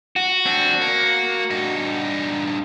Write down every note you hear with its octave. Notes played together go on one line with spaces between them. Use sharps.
F#4
C4 D4
A#3
G2 D#4